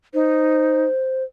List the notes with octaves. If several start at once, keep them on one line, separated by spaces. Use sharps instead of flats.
D#4 C5